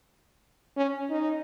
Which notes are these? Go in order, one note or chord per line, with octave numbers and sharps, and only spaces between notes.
C#4
D#4